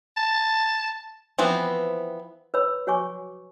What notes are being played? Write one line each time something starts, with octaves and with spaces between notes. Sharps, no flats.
A5
E3 F3 B3 C4
B4 C#5 B5 E6
F#4 C#5 G#5 C#6 D6